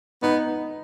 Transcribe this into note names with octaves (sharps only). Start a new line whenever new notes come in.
B3 D#4